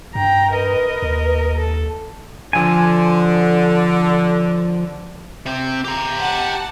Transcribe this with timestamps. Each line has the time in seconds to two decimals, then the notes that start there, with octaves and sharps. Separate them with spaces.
0.15 G2 G5 A#5
0.52 A#4 B4 D#5
1.02 D#2
1.58 A4
2.53 D3 F3 G#5
5.46 C3 C4
5.84 G4 A#5
6.19 F#5 A5